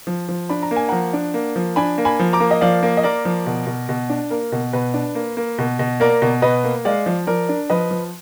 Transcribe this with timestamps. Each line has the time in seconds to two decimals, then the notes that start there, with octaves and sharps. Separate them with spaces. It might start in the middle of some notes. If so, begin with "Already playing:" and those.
0.07 F3
0.29 F3
0.49 D4 B5
0.63 A#5
0.71 A#3
0.76 G#5
0.89 F3 F#5 A#5
1.13 D4
1.34 A#3
1.56 F3
1.76 D4 G#5 B5
1.98 A#3
2.05 G#5 B5
2.20 F3
2.33 A#5 D6
2.40 A#3
2.51 D#5
2.61 F3 D5 F5
2.83 A#3
2.97 D#5
3.03 A#3 A#4 D5
3.25 F3
3.46 B2
3.67 B2
3.89 B2
4.10 D4
4.30 A#3 A#4
4.52 B2
4.73 B2 B4
4.94 D4
5.15 A#3
5.37 A#3
5.58 B2
5.79 B2
6.00 A#3 A#4 D5
6.22 B2
6.42 B2 B4 D#5
6.64 A#3
6.85 G#3 D5 F5
7.06 F3
7.27 F3 A#4 D5
7.49 D4
7.70 F3 B4 D#5
7.90 F3